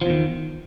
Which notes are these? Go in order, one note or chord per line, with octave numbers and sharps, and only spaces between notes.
E2 D#3 F3